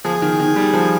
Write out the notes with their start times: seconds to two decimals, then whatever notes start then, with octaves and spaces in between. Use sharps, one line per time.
0.05 F3 G#4
0.22 D#3
0.40 D#3
0.56 G3
0.74 F3